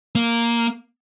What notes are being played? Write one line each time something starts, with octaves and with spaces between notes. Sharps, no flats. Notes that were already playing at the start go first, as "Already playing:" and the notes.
A#3